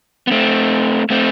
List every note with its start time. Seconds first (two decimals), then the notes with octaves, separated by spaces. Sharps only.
0.27 B3
0.31 A3 C4
1.10 A3 C4